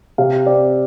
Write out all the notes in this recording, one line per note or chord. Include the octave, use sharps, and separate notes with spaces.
C3 F5
C4 D5